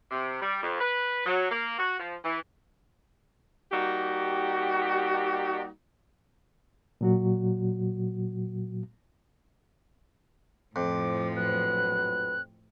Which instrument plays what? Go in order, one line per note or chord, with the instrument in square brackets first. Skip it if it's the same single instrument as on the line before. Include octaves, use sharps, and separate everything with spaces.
[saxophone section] C3
G3
F2
B4
F#3
A#3
F#4
F3
E3
G3 A#3 D#4 F#4 G4
[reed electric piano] A#2 F#3 F#4
[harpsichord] F2 [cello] A2 F3 [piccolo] D6
[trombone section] A#1 F#3 B4 [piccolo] F#6